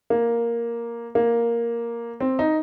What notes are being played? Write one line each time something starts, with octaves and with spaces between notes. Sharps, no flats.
A#3
A#3
C4
D#4